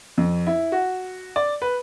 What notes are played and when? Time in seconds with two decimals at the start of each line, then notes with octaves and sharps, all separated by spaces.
0.18 F2
0.47 E4
0.72 F#4
1.36 D5
1.62 B4